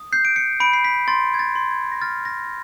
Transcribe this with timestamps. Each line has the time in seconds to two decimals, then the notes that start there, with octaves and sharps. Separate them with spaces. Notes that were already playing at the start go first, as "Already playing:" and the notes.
Already playing: D#6
0.13 G6 C7
0.25 D7
0.36 C#7
0.60 B5 D7
0.73 C7
0.85 B6
1.08 C6 A6
1.34 G#6
1.39 A6
1.55 C6
1.71 G#6
1.92 A#6
2.02 F6 A6
2.25 A#6